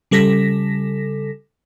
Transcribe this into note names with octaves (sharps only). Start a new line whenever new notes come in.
C#3 G3 A4 A#6 B6